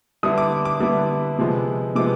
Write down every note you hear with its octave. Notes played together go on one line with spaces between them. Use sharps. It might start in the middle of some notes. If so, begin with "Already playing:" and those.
D3 G3 B3 E4 D#6
D6
D6
D3 G3 B3 E4
C3 F3 G#3 B3
C3 F3 G#3 B3 D6